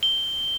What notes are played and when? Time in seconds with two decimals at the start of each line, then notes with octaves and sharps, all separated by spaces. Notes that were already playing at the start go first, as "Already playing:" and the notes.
0.03 G7